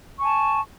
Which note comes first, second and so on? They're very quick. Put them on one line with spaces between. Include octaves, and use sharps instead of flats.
C#6 G#5 A5